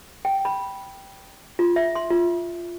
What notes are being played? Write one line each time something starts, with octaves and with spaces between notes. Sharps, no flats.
G5
B5
F4
E5
C6
F4